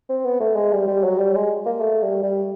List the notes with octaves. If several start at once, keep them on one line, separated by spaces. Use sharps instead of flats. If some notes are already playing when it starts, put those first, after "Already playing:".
C4
B3
A3
G#3
G3
G3
F#3
G3
G#3
A#3
A3
G3
G3